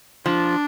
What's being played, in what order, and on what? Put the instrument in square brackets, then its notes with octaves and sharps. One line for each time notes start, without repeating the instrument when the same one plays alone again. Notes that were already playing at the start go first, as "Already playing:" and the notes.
[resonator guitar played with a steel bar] F3 [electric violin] D4